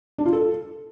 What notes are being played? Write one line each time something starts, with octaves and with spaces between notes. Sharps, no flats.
D4
F4
A4